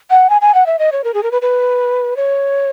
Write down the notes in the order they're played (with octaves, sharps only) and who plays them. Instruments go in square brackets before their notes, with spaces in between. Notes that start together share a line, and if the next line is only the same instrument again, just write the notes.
[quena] F#5
G#5
G#5
F#5
E5
D#5
C#5
A#4
G#4
A#4
B4
B4
C#5